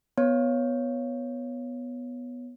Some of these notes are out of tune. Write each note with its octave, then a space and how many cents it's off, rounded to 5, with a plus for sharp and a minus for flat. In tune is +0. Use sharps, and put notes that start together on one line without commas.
B3 +0 C#5 +0